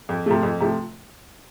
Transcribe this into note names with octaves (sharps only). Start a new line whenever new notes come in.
F2
C3 F3 A3
F2
C3 F3 A3